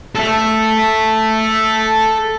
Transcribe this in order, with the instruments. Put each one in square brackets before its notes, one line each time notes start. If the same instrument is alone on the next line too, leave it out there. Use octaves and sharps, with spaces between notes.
[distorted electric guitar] A4 E5